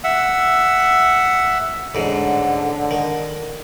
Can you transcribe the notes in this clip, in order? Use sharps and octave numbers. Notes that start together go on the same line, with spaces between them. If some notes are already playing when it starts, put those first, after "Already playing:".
E5 F#5
A1 G#2 D3
D#3